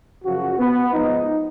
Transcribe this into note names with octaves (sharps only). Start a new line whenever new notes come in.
F#2 C#3 F3 F#4
B3
G#2 F3 D#4